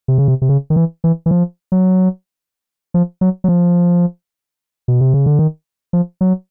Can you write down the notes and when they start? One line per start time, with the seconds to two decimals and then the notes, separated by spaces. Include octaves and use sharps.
0.08 C3
0.18 C#3
0.28 C3
0.42 C3
0.49 C#3
0.70 D#3
0.76 E3
1.04 E3
1.26 E3
1.31 F3
1.72 F#3
2.94 F3
3.21 F#3
3.44 F#3
3.48 F3
4.88 B2
5.01 C3
5.14 C#3
5.26 D3
5.39 D#3
5.93 F3
6.21 F#3